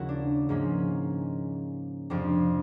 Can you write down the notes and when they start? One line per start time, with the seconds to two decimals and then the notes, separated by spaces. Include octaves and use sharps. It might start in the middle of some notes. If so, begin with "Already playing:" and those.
Already playing: D#2 C#3 F3 G#3 E4 F#4
0.09 D4
0.49 G#2 F3 A#3 C#4
2.10 F2 C3 F3 D4